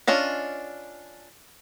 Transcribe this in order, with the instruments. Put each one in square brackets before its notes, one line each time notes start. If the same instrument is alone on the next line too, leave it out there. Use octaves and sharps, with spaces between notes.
[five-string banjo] C#4 D4 F4 D#5